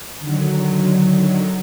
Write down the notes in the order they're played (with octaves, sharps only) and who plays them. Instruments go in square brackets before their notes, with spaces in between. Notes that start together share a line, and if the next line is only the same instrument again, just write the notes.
[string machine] D3 D#3 F#3